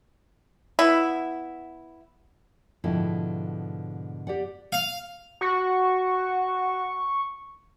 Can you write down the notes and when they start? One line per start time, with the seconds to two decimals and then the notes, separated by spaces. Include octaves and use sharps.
0.79 B3 E4
2.84 G#2 B2 D3 F3 E4 G5
4.27 G4 D5 F#5
4.72 F5
5.41 F#4 C#6